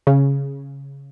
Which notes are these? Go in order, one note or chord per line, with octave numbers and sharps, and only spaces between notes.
C#3